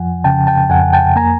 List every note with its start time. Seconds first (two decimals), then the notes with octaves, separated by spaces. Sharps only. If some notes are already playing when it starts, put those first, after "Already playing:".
Already playing: F2 F3 F#5 G#5
0.24 C#3 G5 A5
0.47 G5 A5
0.70 F2 F#5 G#5
0.93 G5 A5
1.16 A#3 G#5 A#5